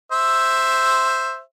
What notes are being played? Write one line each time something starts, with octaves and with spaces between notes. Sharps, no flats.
C5 E5